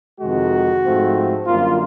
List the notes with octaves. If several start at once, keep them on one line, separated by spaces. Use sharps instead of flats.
F2 C3 D#3 G#3 F#4
G#2 F3 A3 C4
F#2 D3 G3 A#3 F4